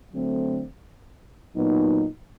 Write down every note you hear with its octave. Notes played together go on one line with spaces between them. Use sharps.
D3 F#3 A3 C4
A#2 F#3 B3 D#4